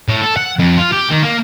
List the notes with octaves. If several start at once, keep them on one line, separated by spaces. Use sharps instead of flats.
A2
A4
F#5
F2
F4
G4
D#3
A#3